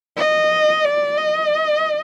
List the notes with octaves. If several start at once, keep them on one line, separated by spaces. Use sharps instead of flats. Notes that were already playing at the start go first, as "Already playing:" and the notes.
D#5
D5
D#5